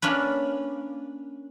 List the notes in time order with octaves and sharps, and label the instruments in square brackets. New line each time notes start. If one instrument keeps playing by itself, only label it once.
[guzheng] A#3 C#4 D4 B4